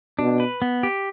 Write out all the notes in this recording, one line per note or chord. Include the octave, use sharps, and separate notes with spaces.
B2 D4
B4
B3
G4